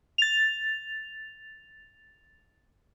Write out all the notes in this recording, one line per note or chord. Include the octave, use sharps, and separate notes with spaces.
A6 F7